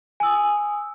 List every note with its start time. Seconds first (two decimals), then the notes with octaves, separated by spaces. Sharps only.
0.20 G#5
0.23 E6
0.26 D#6